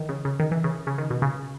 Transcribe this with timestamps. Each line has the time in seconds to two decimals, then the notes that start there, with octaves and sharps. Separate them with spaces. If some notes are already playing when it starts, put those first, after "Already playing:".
Already playing: D#3 E3
0.09 C#3
0.25 C#3
0.40 D#3
0.51 E3
0.64 C#3
0.87 C#3
0.98 D#3
1.10 B2
1.22 C#3